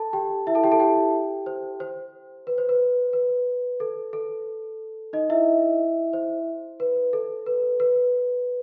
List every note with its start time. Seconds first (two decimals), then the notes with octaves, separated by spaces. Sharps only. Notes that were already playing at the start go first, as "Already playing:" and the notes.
Already playing: A4 A5
0.13 G4 G5
0.47 E4 E5
0.55 A4 A5
0.64 G4 G5
0.72 A4 A5
0.80 G4 G5
1.46 C5
1.80 C5
2.47 B4
2.58 C5
2.69 B4
3.13 B4
3.80 A4
4.13 A4
5.13 D#4 D#5
5.30 E4 E5
6.13 C5
6.80 B4
7.13 A4
7.46 B4
7.80 B4